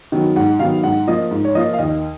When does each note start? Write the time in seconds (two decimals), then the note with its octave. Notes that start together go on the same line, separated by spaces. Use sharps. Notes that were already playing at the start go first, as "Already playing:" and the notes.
0.12 D#3 F#3 B3
0.36 G#2 F#5
0.59 D#3 F#3 B3 F5
0.83 G#2 F#5
1.07 F3 A#3 F4 D#5
1.31 G#2
1.44 C#5
1.55 F3 A#3 F4 D#5
1.73 F5
1.79 D#2 D#5